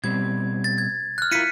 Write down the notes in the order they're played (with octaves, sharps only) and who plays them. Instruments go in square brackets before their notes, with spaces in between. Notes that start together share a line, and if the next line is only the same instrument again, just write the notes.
[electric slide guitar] B2 G3 C4 [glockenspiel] G#6
[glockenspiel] A6
G#6
F6 F#6
[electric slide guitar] E4 F4 A#4 [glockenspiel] B6 C#7 D#7